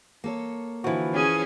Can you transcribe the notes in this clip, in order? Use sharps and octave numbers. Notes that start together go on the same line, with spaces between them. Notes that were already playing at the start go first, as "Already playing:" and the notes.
A#3 A4 C#5
D3 E3 F3 E4 F#4
C#4 G#4